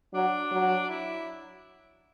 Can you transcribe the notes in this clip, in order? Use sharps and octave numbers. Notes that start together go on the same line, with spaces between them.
F#3 D4
F#3
E4